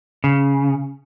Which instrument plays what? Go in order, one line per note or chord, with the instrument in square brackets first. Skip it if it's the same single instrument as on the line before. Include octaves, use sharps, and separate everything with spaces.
[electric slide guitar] C#3